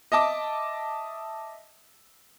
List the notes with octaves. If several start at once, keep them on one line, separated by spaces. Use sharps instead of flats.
D#5 E5 A5 D6